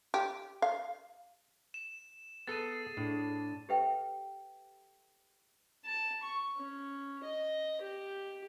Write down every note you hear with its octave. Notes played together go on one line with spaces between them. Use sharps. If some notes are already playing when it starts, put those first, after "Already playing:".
G4
F5
E7
B3 G#4 A4 A6 D#7
A2 D4
G4 A4 B4 E5 G5
A5
C#6
C#4
D#5
G4